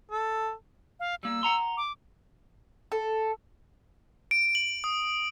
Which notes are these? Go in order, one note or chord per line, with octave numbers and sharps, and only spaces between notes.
A4
F5
G3 A#3 E6
F#5 A#5 C6
D6
A4
D7
F#7
D#6